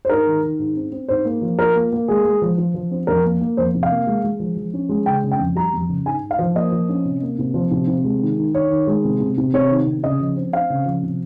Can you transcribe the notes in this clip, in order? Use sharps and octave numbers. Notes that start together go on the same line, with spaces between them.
C5
G#2 A#4
D#3
D#3
G#2
C4
C4
G#2 C5
A#3
F3
F4 A#4
A#3
A#3
G#3 G#4
G#3
F3
F3
F3
C4
F2 A#4
A#3
A#3
F2 C5
C3
F5
A#3
G#3
G#3
F3
F3
C#4
G#3
C#3 G5
C#3
G5
F2
G3 A#5
F2
C#3
G#2 G#5
G#2
F5
F3
A#3 D#5
F3
C#4
C3
A#3
C3
F3
C3
C3
G#3
D#3
D#3
D#3 C#5
D#3
G#3
C3
C3
C3
C3 C#5
D#3
C3
C#3 D#5
F3
C4
C4 F5
C#3
F3
C3